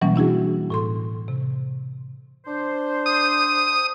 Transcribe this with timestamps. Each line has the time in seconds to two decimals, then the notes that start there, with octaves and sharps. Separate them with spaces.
0.01 B2 E3 F#3 G3 A#3 C#4
0.16 D4 E4 F#4 G#4
0.70 A2 A4 C6
1.28 C3
2.46 D4 C5
3.06 D#6